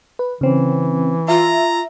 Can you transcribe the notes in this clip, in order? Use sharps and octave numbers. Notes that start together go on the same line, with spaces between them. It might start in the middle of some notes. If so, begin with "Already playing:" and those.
B4
C#3 E3 C4 C#4
F4 E5 A#5